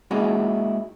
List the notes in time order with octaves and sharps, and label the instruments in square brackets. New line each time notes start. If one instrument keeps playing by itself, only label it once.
[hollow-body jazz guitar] G#3 A#3 C#4 D#4 E4 F#4